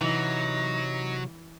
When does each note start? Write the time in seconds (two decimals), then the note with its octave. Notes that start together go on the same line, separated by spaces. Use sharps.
0.01 C3 E3 F#3 D#4